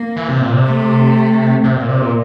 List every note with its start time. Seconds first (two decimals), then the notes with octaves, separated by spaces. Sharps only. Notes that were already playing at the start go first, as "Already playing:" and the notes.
Already playing: A#3
0.16 E3
0.29 C3
0.41 A#2
0.53 C3
0.65 A3
1.64 C3 A#3
1.76 A#2
1.89 C3
2.01 A#2